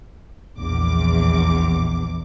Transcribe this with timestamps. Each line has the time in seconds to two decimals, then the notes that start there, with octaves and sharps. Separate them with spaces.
0.56 A#1 E2 D6